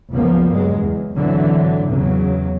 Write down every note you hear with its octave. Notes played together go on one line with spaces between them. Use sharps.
F#1 C#2 F3 A#3 B3
G2 F#3 G#3
E2
G#1 A2 D3 E3 F#3
E2 C#3 F#3